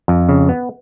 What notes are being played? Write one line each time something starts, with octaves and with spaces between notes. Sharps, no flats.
F2
C#3
B3